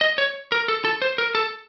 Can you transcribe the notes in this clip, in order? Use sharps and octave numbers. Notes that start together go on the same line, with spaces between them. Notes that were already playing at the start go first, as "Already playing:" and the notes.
D#5
C#5
A#4
A4
A4
C5
A#4
A4